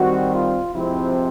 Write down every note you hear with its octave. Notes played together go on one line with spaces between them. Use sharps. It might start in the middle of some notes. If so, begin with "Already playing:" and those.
Already playing: D#3 G3 C4 F#4
F4
C3 F3 G#3 C4 E4